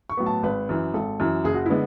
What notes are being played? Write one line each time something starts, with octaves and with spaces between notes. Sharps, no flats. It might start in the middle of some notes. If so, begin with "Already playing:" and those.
C#6
A2 F#3 B3
A5
G#1 B4
F#2 E3
G#1 A4
F#2 E3
F#1 G#4
F#4
D3 G#3 B3 E4